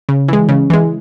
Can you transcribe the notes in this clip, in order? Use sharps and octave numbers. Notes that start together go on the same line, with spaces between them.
C#3
E3 G#3
C#3
E3 G#3